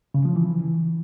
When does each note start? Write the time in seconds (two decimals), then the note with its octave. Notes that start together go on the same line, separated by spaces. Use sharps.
0.14 C#3
0.25 F3
0.36 E3